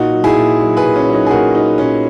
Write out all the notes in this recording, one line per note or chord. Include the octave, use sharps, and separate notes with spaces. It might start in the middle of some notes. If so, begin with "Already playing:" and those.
Already playing: A#2 D#4 F#4
F#3
E4 G#4
A#2
F#3
G#4 B4
A#2
C#4
F#3
D#4
G#4
A#2 F#4 A#4
F#3 D#4
A#2 C#4